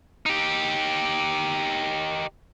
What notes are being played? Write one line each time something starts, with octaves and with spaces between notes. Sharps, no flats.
D#4 G4